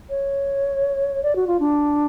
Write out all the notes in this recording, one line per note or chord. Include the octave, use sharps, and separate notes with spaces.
C#5
D5
F#4
F4
D4